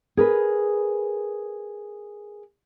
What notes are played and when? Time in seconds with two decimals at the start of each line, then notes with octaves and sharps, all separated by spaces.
0.17 G#4 A#4 B4